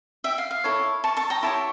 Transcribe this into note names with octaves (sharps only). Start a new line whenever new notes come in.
E5 G5
F5
F5
E4 A4 C#5
A5 C#6
A5 C#6
G5 A#5
E4 G4 C#5 A5 C#6